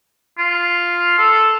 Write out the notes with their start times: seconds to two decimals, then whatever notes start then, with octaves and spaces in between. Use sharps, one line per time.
0.38 F4
1.18 A4